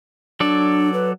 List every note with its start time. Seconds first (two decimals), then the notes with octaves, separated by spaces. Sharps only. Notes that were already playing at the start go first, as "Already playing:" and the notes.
0.40 F#3 D4 A4 D5
0.93 B4